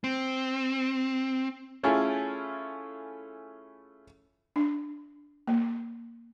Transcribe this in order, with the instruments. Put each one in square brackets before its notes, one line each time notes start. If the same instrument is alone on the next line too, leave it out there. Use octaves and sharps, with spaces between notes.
[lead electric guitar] C4
[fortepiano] A3 C#4 E4 F4 G#4 A4
[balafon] D4
A#3